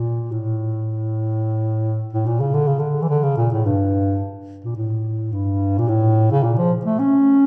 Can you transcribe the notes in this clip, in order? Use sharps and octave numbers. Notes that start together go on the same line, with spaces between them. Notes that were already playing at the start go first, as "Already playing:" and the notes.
Already playing: A#2
A2
A2
A#2
C#3
D3
C#3
D3
E3
D3
C#3
A#2
A2
G2
A#2
A2
G2
A#2
A2
C#3
A#2
F3
A3
C#4